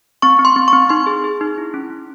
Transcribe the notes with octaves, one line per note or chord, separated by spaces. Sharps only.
C4 C#6
C4
C6
C4
C#6
C4
D#4 C6
G#4
G#4
D#4
E4
C#4
C#4